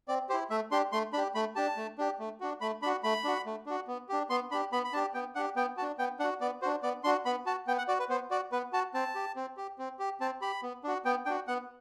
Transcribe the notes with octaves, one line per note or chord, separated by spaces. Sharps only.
C4 D5
E4 G4 C5
A3 E5
D4 G4 C6
A3 C6
D4 G4 B5
A3 B5
D4 G4 A5
A3
D4 G4
A3
D4 F#4
A3 B5
D4 F#4 B5
A3 B5
D4 F#4
A3
D4 F#4
B3
D4 G4
B3 C6
D4 G4 B5
B3 B5
B5
D4 G4 A5
B3 G5
D4 G4 F#5
B3 G5
D4 F#4 A5
B3 G5
D4 F#4 F#5
B3 D5
D4 F#4 C5
B3 D5
D4 F#4 C6
B3 B5
F#4 A5
B3 G5
F#5
F#4 D5
B4
B3 C5
F#4 D5
B3 B4
F#4 A5
C4 A5
G4
C4
G4
C4
G4
C4 A5
G4 B5
B3
D4 F#4
B3 G5
D4 F#4 G5
B3 F#5